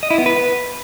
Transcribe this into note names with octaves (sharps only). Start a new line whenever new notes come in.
D#5
E4
B3
B4